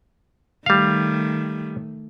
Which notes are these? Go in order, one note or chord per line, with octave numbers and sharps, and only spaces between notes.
D#3 G3 A3 F5